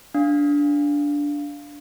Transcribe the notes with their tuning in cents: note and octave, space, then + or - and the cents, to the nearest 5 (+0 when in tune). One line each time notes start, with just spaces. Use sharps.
D4 -15 F5 +0